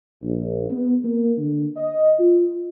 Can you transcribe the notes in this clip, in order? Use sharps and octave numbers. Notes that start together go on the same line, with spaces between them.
A#1
B3
A#3
D3
D#5
F4